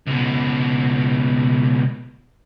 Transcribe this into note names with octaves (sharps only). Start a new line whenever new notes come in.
C#2 B2